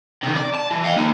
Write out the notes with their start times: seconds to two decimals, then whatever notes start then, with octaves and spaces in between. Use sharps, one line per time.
0.23 C3 D#3
0.37 D5
0.55 A5
0.71 E3
0.84 F5 G5
0.96 A#3 D#4